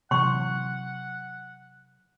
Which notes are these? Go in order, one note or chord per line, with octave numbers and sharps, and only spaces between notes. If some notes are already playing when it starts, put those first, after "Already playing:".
C3 E3 F#3 F#5 C6 C#6